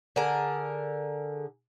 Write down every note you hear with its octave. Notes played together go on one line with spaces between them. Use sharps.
D3 G#4 A#4